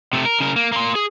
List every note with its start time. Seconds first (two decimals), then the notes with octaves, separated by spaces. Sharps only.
0.13 C3 A3
0.25 A#4
0.40 C#3 A#4
0.56 A#3
0.72 A#3 C6
0.95 G#4